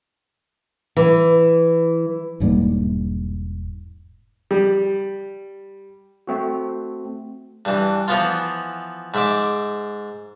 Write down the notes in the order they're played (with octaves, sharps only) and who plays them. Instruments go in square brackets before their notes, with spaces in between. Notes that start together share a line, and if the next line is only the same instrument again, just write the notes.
[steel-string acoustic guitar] E3
[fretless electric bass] E1 G#2 G3 A#3
[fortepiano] G3
[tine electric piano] A3 C4 F#4
[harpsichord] G2 E3
E3 F3 B3 F4
G#2 E5 D6